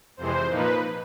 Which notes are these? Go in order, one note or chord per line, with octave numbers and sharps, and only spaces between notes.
F2 C3 E3 G#3 C5
A#2 F3 A#3 D#4 B4